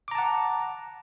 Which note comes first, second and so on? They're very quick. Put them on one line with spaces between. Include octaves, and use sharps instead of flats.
D6 A#5 A5 F#5